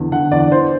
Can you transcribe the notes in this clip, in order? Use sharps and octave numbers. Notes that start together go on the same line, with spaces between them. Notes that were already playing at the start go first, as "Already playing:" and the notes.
Already playing: E2 D3
D3 F#5
E2 D5
E3 C5